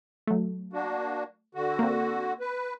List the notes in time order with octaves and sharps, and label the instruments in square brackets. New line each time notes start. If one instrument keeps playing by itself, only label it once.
[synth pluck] F#3 A3
[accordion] A#3 D4 F#4
D3 F#4
[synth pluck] A#3 C4
[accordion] B4